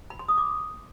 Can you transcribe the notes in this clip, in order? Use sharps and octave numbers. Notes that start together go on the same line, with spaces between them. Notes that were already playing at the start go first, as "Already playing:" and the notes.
B5
C6
D#6
D6